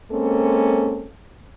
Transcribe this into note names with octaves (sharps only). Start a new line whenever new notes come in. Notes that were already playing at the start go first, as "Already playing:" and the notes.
G#3 A#3 C4 C#4 A4